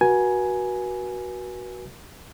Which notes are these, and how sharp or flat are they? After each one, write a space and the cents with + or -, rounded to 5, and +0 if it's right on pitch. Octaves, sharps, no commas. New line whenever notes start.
F#4 +0 B4 -40 G#5 +10